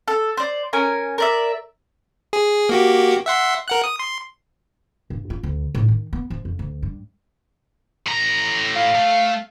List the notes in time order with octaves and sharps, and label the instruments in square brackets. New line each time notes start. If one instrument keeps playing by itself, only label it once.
[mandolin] A4
C5 D5
C#4 A#4 G#5
A#4 D5 E5
[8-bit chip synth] G#4
A#3 F#4 G4
E5 F#5 C6
A#4 F#5 F#6
D#6
C6
[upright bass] G2
F4
D2
A2
D#3
B3
F3
F2
D2
G2
[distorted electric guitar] A2 A#5
[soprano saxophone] F5
[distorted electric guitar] A3